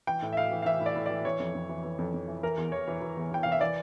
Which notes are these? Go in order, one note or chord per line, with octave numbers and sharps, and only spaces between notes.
E3 G5
A2
E5
A2 F5
E3
F5
E3 E5
A2
D5
A2
E3 D5
E3 C#5
F2
F2
E3
E3
F2
F2
E3
E3 A#4
E2
E2 C#5
E3
E3
E2
E2 G5
E3 F5
E5
E3 D5